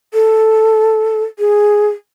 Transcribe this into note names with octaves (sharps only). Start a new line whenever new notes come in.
A4
G#4